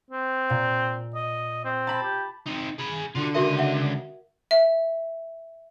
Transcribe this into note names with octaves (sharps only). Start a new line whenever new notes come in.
C4
A#2
D#5
C4
A5 B5
G4
C4 D#4
G#4 B5
D3 F4 F#4
C#2 F#4 A#4 D#5 E5
E5 F#5
E5